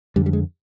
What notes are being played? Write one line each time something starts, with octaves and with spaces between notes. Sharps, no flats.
F2 D3 G3
G3
G#3